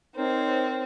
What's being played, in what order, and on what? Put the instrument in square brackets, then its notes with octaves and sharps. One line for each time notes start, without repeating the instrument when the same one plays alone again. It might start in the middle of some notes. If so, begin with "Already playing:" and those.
[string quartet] C4 [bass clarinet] D#4 [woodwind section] A#4 C5 C#5